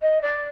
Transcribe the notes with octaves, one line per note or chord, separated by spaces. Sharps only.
D#5
D5